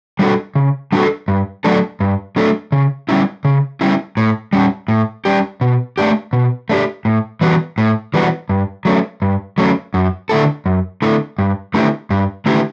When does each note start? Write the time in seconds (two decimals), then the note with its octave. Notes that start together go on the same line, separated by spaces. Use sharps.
0.19 G3 D4 F#4 A4
0.55 C#3
0.92 G3 D4 F#4 A4
1.28 G2
1.64 F#3 A3 D4 A4
2.00 G2
2.36 F#3 A3 D4 A4
2.72 C#3
3.09 G3 C#4 E4
3.45 C#3
3.81 G3 C#4 E4
4.17 A2
4.53 G3 C#4 G4
4.88 A2
5.25 G3 C#4 G4
5.61 B2
5.98 A3 D4 G4
6.33 B2
6.69 A3 D4 G4
7.05 A2
7.41 E3 G3 B3 F#4
7.78 A2
8.14 E3 G3 B3 F#4
8.49 G2
8.85 F#3 A3 C#4
9.22 G2
9.58 F#3 A3 C#4
9.94 F#2
10.29 D3 A3 E4 A4
10.66 F#2
11.02 D3 A3 E4 A4
11.38 G2
11.74 D3 A3 E4 G4
12.10 G2
12.46 D3 A3 E4 G4